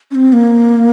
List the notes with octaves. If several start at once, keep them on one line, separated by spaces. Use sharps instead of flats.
C#4
C4
A#3